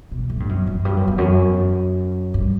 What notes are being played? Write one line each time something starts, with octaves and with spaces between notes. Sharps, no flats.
B2
A2
G2
F#2
F#2
G2
F#2
E2
F#2
G2